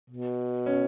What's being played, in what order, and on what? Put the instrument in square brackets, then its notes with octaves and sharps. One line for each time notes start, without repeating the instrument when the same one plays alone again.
[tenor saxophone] B2
[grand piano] C#4